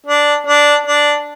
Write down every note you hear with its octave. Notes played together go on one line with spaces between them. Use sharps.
D4
D4
D4